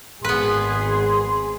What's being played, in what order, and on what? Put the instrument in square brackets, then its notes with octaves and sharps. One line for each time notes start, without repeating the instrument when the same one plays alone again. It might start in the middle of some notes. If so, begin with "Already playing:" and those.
[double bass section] G#1 [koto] B3 B4 [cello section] G#4 [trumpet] C6